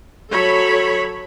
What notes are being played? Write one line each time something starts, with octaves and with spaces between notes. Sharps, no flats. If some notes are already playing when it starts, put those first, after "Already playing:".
F#3 A4 C#5 B5